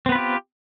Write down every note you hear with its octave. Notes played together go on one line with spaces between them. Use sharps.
B3 C4 F4 G4 B4